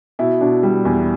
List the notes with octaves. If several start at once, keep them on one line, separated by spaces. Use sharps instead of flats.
B2 E4
B2 D4
G3
E2